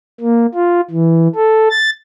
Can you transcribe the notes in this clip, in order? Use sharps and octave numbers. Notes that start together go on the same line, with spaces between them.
A#3
F4
E3
A4
A6